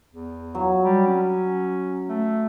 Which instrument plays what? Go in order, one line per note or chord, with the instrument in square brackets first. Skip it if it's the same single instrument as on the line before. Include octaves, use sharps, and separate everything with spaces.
[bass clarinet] E2
[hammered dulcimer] F#3
[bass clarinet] G3
C#4
A3